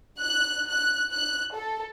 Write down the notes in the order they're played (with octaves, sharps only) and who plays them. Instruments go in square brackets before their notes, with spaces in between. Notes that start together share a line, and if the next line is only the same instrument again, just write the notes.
[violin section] F#6
F#6
F#6
A4